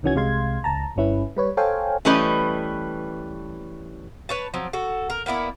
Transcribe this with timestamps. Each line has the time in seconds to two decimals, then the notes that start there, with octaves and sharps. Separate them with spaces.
0.03 C2 D#3 E3 C#4 F#4 G#6
0.15 C2 C3 G#3 F5 C6 G#6
0.64 C#2 A5 A#5
0.96 G1 G2 C#4 E4 B4
1.37 G3 B4 C#5
1.57 A4 C5 C#5 F5 G5 G#5
2.05 E3 G3 A3 C#4 B4 D#5
4.29 B4 C#5 A5
4.54 F3 F#3 C4
4.73 F#4 A4
5.10 A#4
5.26 A#3 B3 E4 D5